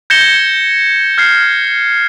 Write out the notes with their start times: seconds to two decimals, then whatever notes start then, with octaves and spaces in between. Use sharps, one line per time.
0.10 G6 G#6 A#6 C#7 E7 G7
1.18 F6 G#6 C7